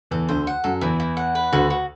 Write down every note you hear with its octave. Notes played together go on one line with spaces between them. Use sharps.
E2 E3 A4
D2 D3 C5
F#5
F#2 F#3 A4
E2 E3 E4
E4
F#5
B4
D2 D3 F#4
F#4